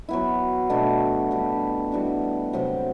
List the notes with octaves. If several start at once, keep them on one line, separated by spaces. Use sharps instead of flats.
F#3 B3 E4
B2 A3 D4 F#4
G3 D4 G4
E3 G3 D4 F#4
C3 F#3 C4